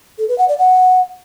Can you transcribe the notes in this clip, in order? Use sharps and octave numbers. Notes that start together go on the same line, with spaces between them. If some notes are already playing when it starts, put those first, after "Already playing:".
A4
B4
F#5
D5
F#5